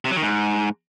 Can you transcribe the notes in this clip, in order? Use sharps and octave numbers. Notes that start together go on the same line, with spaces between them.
C3
F#3
D#3
G#2